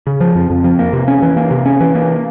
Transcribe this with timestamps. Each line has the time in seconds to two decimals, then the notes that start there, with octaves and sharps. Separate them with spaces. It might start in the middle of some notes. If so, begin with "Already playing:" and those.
0.07 C#3
0.20 F3
0.35 F2
0.50 F2
0.64 F3
0.79 A#3
0.93 C3
1.08 C#4
1.22 E3
1.36 A#3
1.51 C3
1.66 C#4
1.80 E3
1.95 A#3